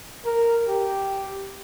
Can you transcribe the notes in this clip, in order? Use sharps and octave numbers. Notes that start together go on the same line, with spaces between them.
A#4
G4